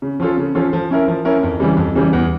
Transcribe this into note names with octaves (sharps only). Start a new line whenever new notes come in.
C#3
F3 C#4 F4 A4
C#3
F3 C#4 F4 A4
F3
C#4 E4 A#4
F3
C#4 E4 A#4
F2
C#3 E3 G3
F2
C#3 E3 G3
E2